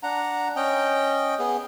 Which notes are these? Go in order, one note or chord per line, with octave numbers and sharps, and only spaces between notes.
D4 F#5 A#5
C#4 D#5 G5
B3 G#4